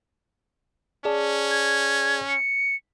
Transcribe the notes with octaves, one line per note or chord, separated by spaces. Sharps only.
C#4 G#4 D5 A5
G#6
C#7